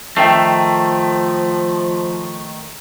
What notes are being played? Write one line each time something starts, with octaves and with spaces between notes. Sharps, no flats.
D#3 F3 A3 E5 G5 C7